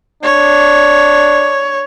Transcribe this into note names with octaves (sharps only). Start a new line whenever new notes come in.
D4 C#5